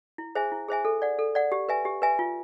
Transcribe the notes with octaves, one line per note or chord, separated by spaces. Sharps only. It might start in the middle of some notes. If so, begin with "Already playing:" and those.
E4
G#4 C5 E5 G#5
E4
G#4 C5 E5 G#5
A4
D5 F#5
A4
D5 F#5
G4
B4 E5 G#5
G4
B4 E5 G#5
F4